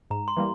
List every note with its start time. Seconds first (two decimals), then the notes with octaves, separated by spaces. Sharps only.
0.10 G#2 A#5
0.28 C6
0.37 E3 G3 A#3